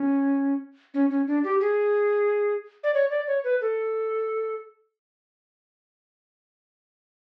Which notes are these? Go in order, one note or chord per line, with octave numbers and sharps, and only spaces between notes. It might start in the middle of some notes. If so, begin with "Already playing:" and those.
Already playing: C#4
C#4
C#4
D4
G4
G#4
D5
C#5
D5
C#5
B4
A4